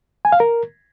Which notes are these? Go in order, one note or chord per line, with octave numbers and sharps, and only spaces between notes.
G#5
F5
A#4